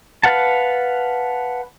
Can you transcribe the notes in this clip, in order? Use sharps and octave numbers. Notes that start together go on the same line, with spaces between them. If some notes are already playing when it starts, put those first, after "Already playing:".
B4 F5 F#5 A5